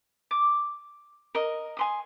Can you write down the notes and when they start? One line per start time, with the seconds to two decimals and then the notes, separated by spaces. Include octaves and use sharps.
0.31 D6
1.35 A#4 D#5
1.77 G#5 C6 D#6